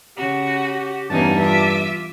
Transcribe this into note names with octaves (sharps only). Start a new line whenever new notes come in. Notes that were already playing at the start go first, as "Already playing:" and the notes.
C#3 F#4 G4
E2 G2 A#3 C#4 D#4 A5
F4 E5 D6